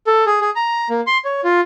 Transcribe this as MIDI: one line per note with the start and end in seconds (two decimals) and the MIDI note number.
0.07 0.24 69
0.26 0.41 68
0.41 0.50 68
0.56 0.89 82
0.90 1.01 58
1.07 1.18 84
1.25 1.41 73
1.44 1.61 65